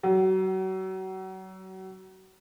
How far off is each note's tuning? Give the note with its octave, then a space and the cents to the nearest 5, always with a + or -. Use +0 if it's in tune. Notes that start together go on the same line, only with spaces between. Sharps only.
F#3 +35